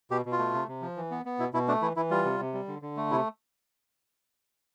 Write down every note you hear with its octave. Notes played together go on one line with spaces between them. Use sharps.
B2 G4
B2
F4
A3
C3
C3
F3
E3
B3
B3
B2 E4
B2 E4
A3 D4
E3 E4
E3 E4
G3 F4
C3
C3
G3
D3
D3
A3
C3 E4